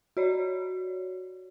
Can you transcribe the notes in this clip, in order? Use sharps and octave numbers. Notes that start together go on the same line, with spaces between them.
F#4 C#5 D5